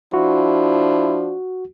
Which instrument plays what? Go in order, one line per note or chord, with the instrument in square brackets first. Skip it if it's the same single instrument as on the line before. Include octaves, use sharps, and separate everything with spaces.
[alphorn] F3 [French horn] D4 [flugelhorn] E4 [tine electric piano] F#4